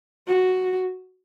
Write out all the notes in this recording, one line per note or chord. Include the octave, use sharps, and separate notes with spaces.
F#4